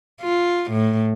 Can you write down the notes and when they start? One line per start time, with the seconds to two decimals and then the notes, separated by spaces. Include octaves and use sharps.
0.22 F4
0.71 A2